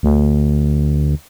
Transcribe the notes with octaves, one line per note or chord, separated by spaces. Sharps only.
D2